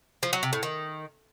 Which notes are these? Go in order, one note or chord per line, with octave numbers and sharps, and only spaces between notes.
F3
F#3
C3
A2
D#3